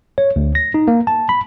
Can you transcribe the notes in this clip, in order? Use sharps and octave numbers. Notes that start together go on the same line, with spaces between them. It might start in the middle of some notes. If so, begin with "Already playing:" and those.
C#5
D2
A#6
D#4
A#3
A5
B5